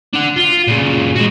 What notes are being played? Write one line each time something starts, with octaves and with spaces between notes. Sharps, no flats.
D4 F#5
F4
A#2 C#3
G#3 F#4